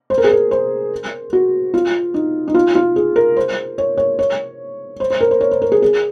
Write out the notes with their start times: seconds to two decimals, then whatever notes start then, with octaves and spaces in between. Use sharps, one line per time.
0.10 C5
0.18 A#4
0.24 G#4
0.31 A#4
0.51 C5
1.33 F#4
1.74 F4
2.14 D#4
2.48 D#4
2.54 F4
2.75 F4
2.96 G#4
3.16 A#4
3.37 C5
3.78 C#5
3.97 C#5
4.19 C#5
5.00 C5
5.10 C5
5.21 A#4
5.31 C5
5.41 C#5
5.51 C5
5.62 A#4
5.72 G#4
5.82 G#4